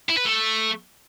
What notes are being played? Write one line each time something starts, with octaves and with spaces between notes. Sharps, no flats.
E4
B4
A3